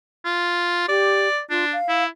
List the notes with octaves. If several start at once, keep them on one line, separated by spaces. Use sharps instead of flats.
F4
G4 D5
D4 F4
F5
E4